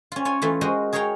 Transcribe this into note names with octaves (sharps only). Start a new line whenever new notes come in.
C#4 F4
F4 C#5 G#5
E3 A3 F4
G#3 F#4 A#4 C5 D#5
G#4 A#4 C#5 F5 G5 A#5